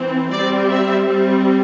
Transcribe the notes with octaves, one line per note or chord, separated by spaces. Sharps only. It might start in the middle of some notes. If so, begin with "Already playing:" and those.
Already playing: E3 C4
G3 C4 D5
E5
G3 C4